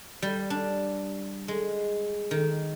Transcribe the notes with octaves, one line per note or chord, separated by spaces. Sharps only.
G3
D4
G#3
D#3